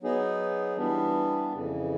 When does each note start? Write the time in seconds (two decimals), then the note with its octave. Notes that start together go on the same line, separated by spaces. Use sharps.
0.02 F#3 B3 D#4 G#4
0.77 E3 G3 B3 D4
1.52 F2 C#3 E3